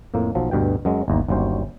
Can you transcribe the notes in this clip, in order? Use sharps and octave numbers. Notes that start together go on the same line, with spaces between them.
F2 A2 A#3
B1 F3 F#3
D2 G2 B2 G5
F#2 F#3 G#3
G1 D#2 A#5
G1 D#2 F#3 G3 C#4 C5